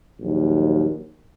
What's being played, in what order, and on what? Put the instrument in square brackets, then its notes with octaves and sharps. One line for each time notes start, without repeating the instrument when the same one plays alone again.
[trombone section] A#1 D#2 F#3